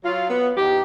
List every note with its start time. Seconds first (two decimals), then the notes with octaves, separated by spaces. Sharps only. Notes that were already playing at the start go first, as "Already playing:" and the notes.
0.04 F#3 F4
0.30 B3
0.57 E2 D#4 G4